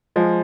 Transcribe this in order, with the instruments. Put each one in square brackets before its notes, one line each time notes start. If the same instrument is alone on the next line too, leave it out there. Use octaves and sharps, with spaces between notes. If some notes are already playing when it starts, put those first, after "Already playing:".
[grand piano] F3 G#3